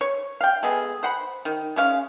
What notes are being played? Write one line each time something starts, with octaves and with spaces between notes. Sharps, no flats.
C#5
F5 G5
G#3 B3 G#4 A4
C5 F#5 B5
D#3
G#3 C#4 F5